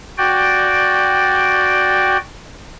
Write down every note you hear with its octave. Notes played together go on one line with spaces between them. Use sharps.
F#4 D5 G5